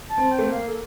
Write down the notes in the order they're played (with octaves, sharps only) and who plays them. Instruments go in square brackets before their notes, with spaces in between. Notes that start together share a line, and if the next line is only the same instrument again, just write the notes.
[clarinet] A5
[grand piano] C4
[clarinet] G5
[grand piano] A3
A#3
[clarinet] F5
A4